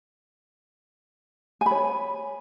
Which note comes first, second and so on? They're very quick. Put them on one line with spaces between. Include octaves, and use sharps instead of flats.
G#5 B5 C#5